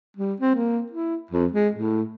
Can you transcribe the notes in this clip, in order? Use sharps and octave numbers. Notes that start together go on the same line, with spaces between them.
G3
C4
A#3
E4
F2
G#3
A2